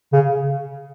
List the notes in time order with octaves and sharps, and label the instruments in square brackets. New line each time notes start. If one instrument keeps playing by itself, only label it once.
[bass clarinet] C#3